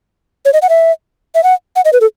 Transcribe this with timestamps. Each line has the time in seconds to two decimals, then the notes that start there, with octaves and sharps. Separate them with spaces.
0.45 C#5
0.53 D#5
0.62 F#5
0.69 E5
1.35 E5
1.43 F#5
1.76 F#5
1.85 D#5
1.93 B4
2.01 A4